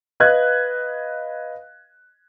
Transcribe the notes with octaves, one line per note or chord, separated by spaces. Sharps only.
B4 D#5 F5 F#6 G#6